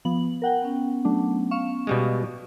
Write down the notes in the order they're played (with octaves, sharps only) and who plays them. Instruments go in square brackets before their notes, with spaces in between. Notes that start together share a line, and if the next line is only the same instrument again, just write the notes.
[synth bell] F3 B3 F#7
A#4 F#5 G5
[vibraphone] B3 C#4
[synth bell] F#3 A3 D4
F5 C#6 E7
[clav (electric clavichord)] B2 G3 G#3